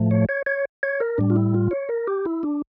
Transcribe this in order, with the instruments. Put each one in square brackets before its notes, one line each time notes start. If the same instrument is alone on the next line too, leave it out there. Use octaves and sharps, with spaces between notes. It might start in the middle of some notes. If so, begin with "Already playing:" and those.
Already playing: [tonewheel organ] A2 F3 A3
C#5
C#5
C#5
C#5
A#4
A2 G3 D4
F4
E4
F4
C#5
A#4
G4
E4
D4